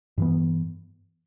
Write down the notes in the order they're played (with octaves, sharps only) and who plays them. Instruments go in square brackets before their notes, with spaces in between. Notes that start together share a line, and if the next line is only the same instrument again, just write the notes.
[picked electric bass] G2 E3 B3